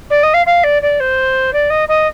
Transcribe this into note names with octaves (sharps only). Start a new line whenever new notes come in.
D5
D#5
F5
F5
D5
D5
C5
D5
D#5
D#5